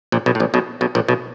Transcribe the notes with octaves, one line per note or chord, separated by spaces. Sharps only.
A#1 A#2
B1 B2
A2
A#1 A#2
B1 B2
B1 B2
A#1 A#2
B1 B2